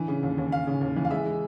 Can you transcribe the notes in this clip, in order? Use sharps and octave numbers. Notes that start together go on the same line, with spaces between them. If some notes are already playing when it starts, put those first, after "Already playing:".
Already playing: D3 E3
C#3
D#2
D#2
D#2 F5
C#3
D#2
E3
F5
G#3 E5
G#3